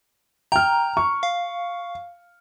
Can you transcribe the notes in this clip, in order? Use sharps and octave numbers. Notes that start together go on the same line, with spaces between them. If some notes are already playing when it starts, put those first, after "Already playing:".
G5 A#5 F6
C#6
F5